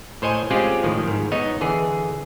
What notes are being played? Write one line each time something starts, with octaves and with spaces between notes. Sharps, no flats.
A2 C5 C#5 D#5 G#5
G#3 C4 C#4 F4 G4 G#4
A2 D#3 F3
G#2
B3 D#4 C#5 D#5
D3 E3 G#4